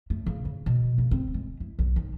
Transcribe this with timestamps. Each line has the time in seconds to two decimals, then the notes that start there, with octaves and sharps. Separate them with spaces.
0.10 A3
0.26 C#3
0.45 C#3
0.66 B2
0.98 C#3
1.11 C4
1.34 G#3
1.60 E4
1.79 B1
1.96 D#3